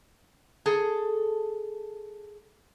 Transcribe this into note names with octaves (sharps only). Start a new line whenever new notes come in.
G#4 A4